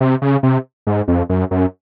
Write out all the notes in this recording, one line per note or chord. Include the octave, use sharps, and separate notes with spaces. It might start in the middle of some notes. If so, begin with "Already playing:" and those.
C3
C#3
C3
G#2
F2
F#2
F#2